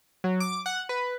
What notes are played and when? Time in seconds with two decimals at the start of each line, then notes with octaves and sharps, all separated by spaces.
0.24 F#3
0.40 D6
0.66 F#5
0.89 B4